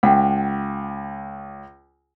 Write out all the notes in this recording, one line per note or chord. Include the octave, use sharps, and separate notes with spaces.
C#2 F#5 G5